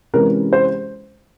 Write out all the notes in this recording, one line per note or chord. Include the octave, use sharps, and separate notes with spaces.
C3 E3 G#3 C#4 A#4
C5